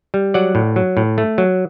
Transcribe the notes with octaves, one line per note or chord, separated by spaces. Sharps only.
G3
F#3 D5 F#5
A2
F#3
A2
A3
F#3